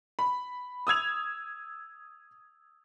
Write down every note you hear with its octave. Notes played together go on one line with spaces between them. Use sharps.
B5
D#6 E6 G#6 F7